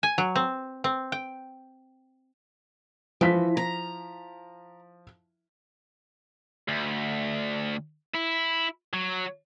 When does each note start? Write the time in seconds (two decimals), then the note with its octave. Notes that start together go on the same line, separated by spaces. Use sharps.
0.03 G#5
0.18 F#3
0.36 C4
0.84 C4
1.12 G5
3.21 E3 F3 B6
3.57 A#5
6.68 D2
8.15 E4
8.93 F#3